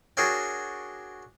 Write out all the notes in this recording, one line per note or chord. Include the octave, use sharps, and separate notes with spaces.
D4 F#4 G#4 A#4 C#5 G5